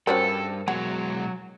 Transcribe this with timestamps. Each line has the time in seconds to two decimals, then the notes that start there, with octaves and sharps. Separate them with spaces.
0.07 G2 C4 C#4 F#4 A4 A#4 C5
0.68 B2 F#3 G#3 C#5 F#5